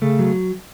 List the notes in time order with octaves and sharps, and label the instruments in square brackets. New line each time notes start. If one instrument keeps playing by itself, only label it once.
[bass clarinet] C#3 [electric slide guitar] A3
[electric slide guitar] F#3